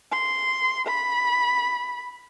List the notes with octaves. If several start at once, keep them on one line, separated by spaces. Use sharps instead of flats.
C6
B5